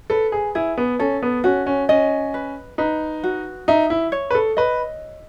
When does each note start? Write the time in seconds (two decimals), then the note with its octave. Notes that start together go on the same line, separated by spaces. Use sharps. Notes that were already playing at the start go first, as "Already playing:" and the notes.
0.10 A4 B4
0.32 G#4
0.55 E4 G#4
0.78 B3
0.99 C#4 A4
1.23 B3
1.44 C#4 F#4
1.67 C#4
1.89 C#4 D#5
2.34 B4
2.78 D#4 B4
3.24 F#4
3.68 D#4 E5
3.90 E4
4.12 C#5
4.31 B4
4.35 A4
4.57 B4 D#5